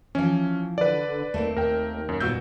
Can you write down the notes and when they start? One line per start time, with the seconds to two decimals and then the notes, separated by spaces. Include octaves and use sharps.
0.15 E3 F3 C#4
0.78 D3 B4 D5
1.34 D#2 A3 A#3 C4
1.57 D#2 A#4 G5
2.09 F#2
2.20 D#2 A#2 G3 B3 F#4 E6 G6